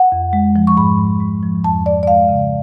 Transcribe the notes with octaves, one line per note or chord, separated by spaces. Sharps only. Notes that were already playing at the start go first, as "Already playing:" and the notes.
Already playing: F#5
F2
G#3
F3
C#6
G#2 B5
G#2
G#3
F3
F2 A5
F2 D5
D5
G#3 F5
C#3